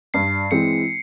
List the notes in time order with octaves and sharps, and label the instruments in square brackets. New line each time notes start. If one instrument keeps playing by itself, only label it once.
[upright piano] G2 [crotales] C7
[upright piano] E3 G#3 C4 [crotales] C#7